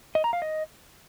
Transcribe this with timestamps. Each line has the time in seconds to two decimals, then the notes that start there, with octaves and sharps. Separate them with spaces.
0.15 D#5
0.24 A#5
0.33 F5
0.42 D#5